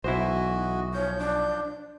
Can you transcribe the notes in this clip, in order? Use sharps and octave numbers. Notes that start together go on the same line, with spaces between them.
B1 E3 E4 F#4 C5 D#5
F3 C#5 G6
D4